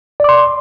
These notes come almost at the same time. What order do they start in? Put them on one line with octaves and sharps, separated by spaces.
D5 D6 C6